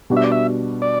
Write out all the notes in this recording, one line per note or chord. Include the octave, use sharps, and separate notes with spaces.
B2 G3 D4 F#4
E5
D5
E5
D5